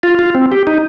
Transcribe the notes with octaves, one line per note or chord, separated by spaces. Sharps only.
F4
F4
C4
G4
D#4